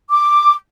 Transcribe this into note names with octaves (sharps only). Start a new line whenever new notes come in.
D6